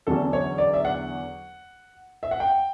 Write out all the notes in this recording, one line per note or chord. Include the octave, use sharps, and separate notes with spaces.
E2 D3 F#3 C#4 A4
C#5
D5
E5
F#5
E5
F#5
G5